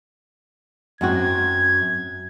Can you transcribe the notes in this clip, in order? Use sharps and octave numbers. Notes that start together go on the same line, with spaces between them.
F#2 C4 F#4 G#6